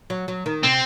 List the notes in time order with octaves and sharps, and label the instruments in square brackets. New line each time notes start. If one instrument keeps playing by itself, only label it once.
[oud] F#3
F#3
D#3
[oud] C3 [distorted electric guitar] C4